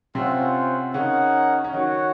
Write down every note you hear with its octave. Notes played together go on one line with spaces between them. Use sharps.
C3 C4 C#4 F4 C5 F#5
C#3 C#4 D#4 A#4 C#5 F#5
C#4
D#3 D#4 F#4 C#5 F#5